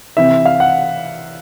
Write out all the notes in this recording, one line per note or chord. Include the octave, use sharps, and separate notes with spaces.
C3 E3 E5
F5
F#5